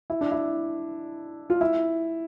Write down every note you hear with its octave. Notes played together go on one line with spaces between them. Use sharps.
E4
D4
E4
F4
E4